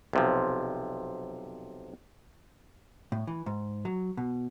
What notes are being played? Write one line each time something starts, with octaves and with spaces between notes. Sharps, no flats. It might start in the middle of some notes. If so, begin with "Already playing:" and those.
B1 C3 F3
A2
E3
G#2
F#3
B2